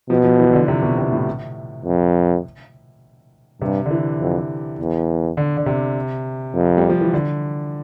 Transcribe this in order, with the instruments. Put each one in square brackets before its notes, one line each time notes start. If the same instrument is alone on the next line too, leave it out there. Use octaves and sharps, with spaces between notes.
[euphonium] B2 [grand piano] F3
[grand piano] F3
E3
D3
C3
B2
C3
A2
[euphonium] F2
[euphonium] G2 [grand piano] C3
[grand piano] D3
E3
[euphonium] F2
E2
[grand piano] D3
D3
C3
[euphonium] F2
[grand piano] G3
F3
E3
D3